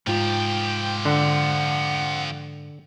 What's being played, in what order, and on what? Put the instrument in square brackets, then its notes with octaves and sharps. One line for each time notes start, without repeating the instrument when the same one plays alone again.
[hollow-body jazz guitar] G#2 F4 [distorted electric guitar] F3 G4 [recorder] G5
[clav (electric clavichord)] D3 [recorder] F#5